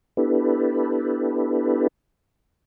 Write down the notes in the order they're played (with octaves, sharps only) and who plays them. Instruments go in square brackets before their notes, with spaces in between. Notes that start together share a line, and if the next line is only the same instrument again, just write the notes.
[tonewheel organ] B3 D4 E4 G4 A4 B4